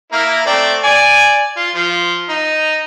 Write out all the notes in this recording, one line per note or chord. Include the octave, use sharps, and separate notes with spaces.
A#3 E4 A#4
A3 C4 D5
D5 G#5
F4
F3
D#4